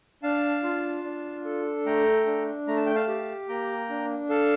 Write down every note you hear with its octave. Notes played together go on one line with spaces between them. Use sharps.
D4 F5 A5
F4
D4
A4
A3 G5 A#5
D4
A3 A#5
A5
G5
F5 A5
G4
A#3 G5 A#5
D4
A4 F5 A5